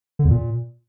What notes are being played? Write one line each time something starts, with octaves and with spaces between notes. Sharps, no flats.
D3
E2
A#2